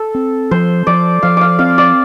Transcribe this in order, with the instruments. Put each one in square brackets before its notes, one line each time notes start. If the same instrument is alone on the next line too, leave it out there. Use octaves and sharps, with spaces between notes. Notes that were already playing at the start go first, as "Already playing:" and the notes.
Already playing: [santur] A4
[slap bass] C4
[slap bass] F3 [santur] C5
[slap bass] F3 [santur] D5
[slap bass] F3 [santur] F5
[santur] D5 F5
[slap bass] C4 [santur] F5
[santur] D5